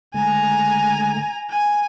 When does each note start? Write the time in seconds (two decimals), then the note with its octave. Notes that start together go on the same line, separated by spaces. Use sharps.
0.14 D3 G#3 A3 G#5 A#5
1.50 G#5